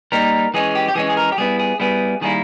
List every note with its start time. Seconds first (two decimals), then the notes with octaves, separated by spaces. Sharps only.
0.12 G3 A#3 D#4 A#4
0.54 E3 G#3 C#4 G#4
0.75 G4
0.88 G4
0.95 E3 G#3 C#4 G#4
1.09 G#4
1.17 A#4
1.32 G4
1.38 G3 B3 E4 G#4
1.60 G#4
1.80 G3 B3 E4 G#4
2.21 D#3 G3 A#3 E4 G#4